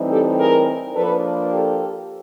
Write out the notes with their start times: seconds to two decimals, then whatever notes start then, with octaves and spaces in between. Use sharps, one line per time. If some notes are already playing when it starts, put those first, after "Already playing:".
Already playing: A2 E3 G3 C4 D#4
0.10 G4 A4
0.38 G#4 A#4
0.94 F3 A#3 D4 A4 B4
1.51 G4 A4